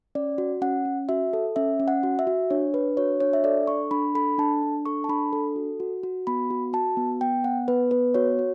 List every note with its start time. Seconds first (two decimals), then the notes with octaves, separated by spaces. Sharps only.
0.15 C#4 D5
0.38 F#4
0.62 C#4 F#5
0.85 C#4
1.09 F#4 E5
1.33 A4
1.56 C#4 E5
1.80 C#4
1.88 F#5
2.03 F#4
2.19 E5
2.27 F#4
2.50 D4 C#5
2.74 D4 B4
2.97 F#4 C#5
3.20 D4 C#5
3.33 E5
3.44 A4 D5
3.67 D4 C#6
3.91 D4 B5
4.15 A4 B5
4.38 D4 A5
4.63 D4
4.86 A4 C#6
5.04 A5
5.09 D4 B5
5.33 A4
5.56 F#4
5.80 F#4
6.03 F#4
6.27 B3 B5
6.50 F#4
6.73 F#4 A5
6.97 B3
7.21 B3 G5
7.44 B3 F#5
7.68 B3 B4
7.91 B3 B4
8.14 F#4 C#5
8.39 F#4